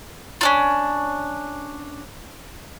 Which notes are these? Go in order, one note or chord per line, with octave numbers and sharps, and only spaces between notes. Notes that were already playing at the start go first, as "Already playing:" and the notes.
C#4 D4 F4